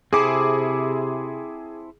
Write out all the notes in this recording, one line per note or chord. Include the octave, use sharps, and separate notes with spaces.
C3 C4 E4 G#4 A4 D6